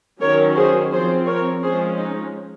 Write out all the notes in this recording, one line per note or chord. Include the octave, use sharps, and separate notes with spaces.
D#3 F#3 C#4 A#4 C#5
G#4 C5
F3 C4 G#4 C5
A#4 C#5
F3 G#3 C#4 G#4 C5
D#4